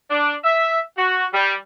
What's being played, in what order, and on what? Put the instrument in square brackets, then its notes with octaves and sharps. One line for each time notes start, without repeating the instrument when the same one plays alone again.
[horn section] D4
E5
F#4
G3